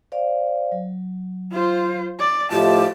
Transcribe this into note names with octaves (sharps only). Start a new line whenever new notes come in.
C5 D5 F5
F#3
F4 C5
D5
A2 F3 E4 G4 D#5 A5